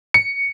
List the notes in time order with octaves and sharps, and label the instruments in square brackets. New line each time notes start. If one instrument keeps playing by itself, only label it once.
[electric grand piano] C#7